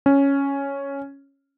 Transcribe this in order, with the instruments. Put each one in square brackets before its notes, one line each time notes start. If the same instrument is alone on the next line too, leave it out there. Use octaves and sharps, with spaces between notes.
[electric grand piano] C#4